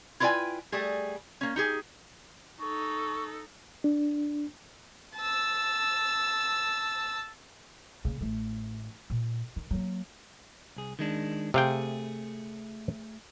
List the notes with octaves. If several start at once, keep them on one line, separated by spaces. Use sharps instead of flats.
E4 F4 B4 D5 G5 G#5
G3 A3 G#4
A#3 C#4
D#4 G4 G#4
D#4 A4 C#6
D4
A5 E6
C#3 A#3
A1 A3
A#2
D#3
F#3 A#3
C2 G#4
D#3 G#3 D4
C3 A3 G#4 F5 G5